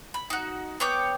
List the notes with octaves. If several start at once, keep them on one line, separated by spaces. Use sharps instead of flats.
B5
D#4 F#4
B3 C#5 G5 D6